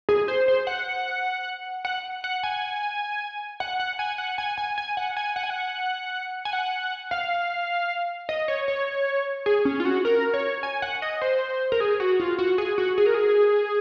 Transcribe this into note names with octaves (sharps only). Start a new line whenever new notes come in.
G#4
C5
C5
F#5
F#5
F#5
G#5
F#5
F#5
G#5
F#5
G#5
G#5
G#5
F#5
G#5
F#5
G#5
F#5
G#5
F#5
F5
D#5
C#5
C#5
G#4
C#4
F4
F#4
A#4
C#5
G#5
F#5
D#5
C5
A#4
G#4
F#4
F4
F#4
G#4
F#4
G#4
A#4
G#4